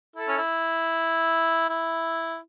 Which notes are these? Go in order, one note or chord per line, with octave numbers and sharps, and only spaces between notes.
E4 A4
C#4
E4
E4